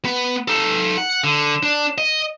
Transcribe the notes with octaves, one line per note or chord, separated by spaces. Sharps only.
B3
D#4 A4
F#5
D3
D4
D#5